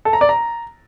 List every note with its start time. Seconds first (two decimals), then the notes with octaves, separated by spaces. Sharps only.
0.05 A4
0.13 A#5
0.21 D5
0.29 A#5